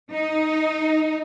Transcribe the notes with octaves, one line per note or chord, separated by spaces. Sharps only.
D#4